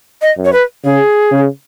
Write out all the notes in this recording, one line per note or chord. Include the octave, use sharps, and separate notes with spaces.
D#5
F#2
C#5
B4
C#3 G#4
C#3